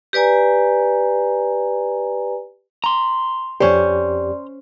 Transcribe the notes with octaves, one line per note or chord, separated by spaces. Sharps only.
G4 B4 D5 G#5 A#5
A#5 C6
F2 C#4 G4 C5 D5